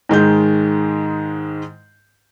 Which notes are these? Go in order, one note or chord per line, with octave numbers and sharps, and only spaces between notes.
G#2 D#3 G#3 G6